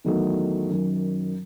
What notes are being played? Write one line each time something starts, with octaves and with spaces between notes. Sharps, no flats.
E2 D#3 F#3 A3 D#4
F#2 D#3 F#3